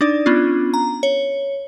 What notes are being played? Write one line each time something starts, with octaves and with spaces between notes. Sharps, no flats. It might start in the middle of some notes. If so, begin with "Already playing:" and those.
D4 D#4 D5
B3 C#4 D4 F4
A#5
C#5